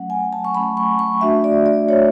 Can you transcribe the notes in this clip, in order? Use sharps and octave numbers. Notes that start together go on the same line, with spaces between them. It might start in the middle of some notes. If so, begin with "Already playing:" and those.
Already playing: F#3 A3 C#4 F#5
G#5
A5
C#6
F#3 A3 C#4 B5
C#6
C#6
A3 D4 F#4 E5
D5
D5
A3 D4 F#4 C#5